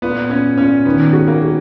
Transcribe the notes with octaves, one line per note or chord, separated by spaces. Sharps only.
A#2 B3
A#2 C#4
A#2 C#4
D#3 B3
F#4
A#3
F#4